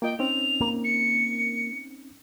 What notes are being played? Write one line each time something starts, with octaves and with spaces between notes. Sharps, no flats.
A#3 F4 D#5 G5
C4 C#4 D#4 F7
A#3
C#7